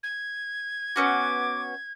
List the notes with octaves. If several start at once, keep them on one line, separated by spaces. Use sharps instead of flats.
G#6
B3 C#4 F#4 D6